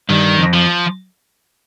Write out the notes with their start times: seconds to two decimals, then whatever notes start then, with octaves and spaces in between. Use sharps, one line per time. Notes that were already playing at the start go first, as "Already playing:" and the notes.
0.09 G2 D#3
0.38 F2
0.54 F3